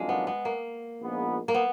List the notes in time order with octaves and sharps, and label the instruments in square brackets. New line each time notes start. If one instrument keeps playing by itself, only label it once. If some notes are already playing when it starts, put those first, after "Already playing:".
Already playing: [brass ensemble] F2 D#3 F#3 D4 F4 [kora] G#3
[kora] B3
B3
A#3
[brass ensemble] A#1 G#2 F3 B3
[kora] A#3
B3